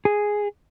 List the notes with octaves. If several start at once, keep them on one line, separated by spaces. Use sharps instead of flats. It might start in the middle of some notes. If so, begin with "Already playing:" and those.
G#4